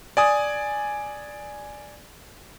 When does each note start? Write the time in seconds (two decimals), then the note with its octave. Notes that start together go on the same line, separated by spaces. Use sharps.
0.17 D5 G#5 D#6